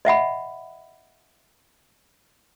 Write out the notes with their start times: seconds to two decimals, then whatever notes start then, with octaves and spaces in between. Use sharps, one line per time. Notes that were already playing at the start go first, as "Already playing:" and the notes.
0.05 D#5 E5 F#5 B5